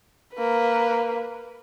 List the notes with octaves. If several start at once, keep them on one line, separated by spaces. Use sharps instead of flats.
A#3 B4